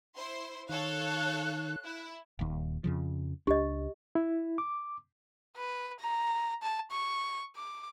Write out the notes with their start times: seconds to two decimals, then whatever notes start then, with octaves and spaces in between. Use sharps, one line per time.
0.16 E4 C5 C6
0.69 D#3 A4 C#5 F5 F#6
1.84 E4
2.39 D#1 D#2
2.84 F2 C#3 F3
3.47 C#2 D4 G4 D#5
4.15 E4
4.58 D6
5.56 B4
6.00 A#5
6.63 A5
6.91 C#6
7.56 D6